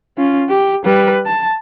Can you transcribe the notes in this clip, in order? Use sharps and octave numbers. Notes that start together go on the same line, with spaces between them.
C#4 F4
G4
G3 B4
A5